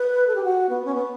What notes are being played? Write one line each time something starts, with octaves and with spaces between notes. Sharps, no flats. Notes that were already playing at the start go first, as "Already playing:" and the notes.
Already playing: B4
A4
G4
F#4
B3
C#4
B3